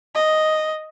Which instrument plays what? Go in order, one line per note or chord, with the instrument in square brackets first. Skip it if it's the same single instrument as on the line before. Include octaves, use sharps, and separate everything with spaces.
[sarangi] D#5